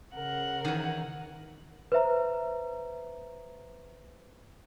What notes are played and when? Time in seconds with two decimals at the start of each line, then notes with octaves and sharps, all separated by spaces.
0.14 C#3 A#4 F#5
0.65 D#3 E3
1.92 B4 C5 E5 A#5